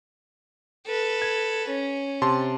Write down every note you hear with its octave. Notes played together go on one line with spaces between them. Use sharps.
A4 B4
G#6
C#4
C3 A5 C6